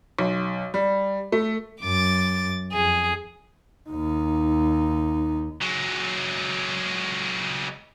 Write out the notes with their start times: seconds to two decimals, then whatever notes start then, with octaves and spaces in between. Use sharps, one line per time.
0.19 B1
0.74 G3
1.32 A3
1.82 F#2 D6 A6
2.73 F2 G#4
3.89 D#2 D#4
5.62 F#3 G#3